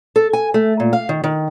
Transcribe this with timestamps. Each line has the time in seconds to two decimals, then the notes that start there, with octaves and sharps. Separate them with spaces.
0.16 A4
0.33 G#5
0.54 A3
0.80 A#2
0.93 F5
1.09 D#3
1.24 D#3